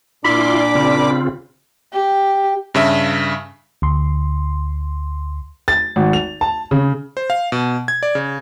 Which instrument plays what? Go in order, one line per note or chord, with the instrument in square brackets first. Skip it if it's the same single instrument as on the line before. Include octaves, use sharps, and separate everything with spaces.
[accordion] A#2 D6 [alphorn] D4 [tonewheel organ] E4 F4 C6 [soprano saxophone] B5
[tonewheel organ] C#3 C4 F4
[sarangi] G4
[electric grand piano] G2 C#3 E5
[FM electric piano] D2 C6
[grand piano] A6
G#1
F7
A5
C#3
[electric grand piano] C5
F5
B2
G#6
D5
C#3